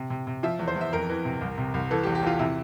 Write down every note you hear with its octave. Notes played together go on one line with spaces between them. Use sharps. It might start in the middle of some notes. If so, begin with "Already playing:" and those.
Already playing: C3
C3
C3
F3 E5
E2
C5
E2
E5
F2 A#4
E3
C3
C2
C3
C2
E3 A4
G4
E2
G4
E2 F4
C3 E4